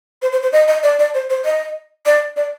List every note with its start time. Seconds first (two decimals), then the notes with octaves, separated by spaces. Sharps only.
0.22 C5
0.32 C5
0.43 C5
0.52 D#5
0.68 D#5
0.83 D5
0.99 D5
1.14 C5
1.30 C5
1.45 D#5
2.06 D5
2.36 D5